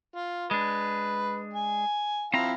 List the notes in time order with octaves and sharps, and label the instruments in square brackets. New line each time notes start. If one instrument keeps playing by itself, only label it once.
[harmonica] F4
[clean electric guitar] G#3 D4 [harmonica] B4
[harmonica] G#5
[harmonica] F3 E4 F5 [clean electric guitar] C4 A#5